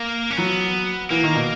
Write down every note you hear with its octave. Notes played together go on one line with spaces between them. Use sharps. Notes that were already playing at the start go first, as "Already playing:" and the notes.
Already playing: A#3
C#4
F#3 B3
E3 A#3
D#3
B2